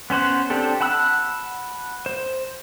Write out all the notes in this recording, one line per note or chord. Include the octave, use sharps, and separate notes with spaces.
B3 C#4 C5 F#5
C4 D4 G4 A4
F#5 A5 B5 E6 F#6
C5